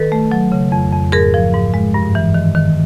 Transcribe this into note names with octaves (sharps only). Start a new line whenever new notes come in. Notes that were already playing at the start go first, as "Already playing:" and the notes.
Already playing: D#3 A4 B4
A3
F#3
C#3
F2
F2
G#2 G#4 A#4
F3
G#2
G#3
G2
E3
D#3
D#3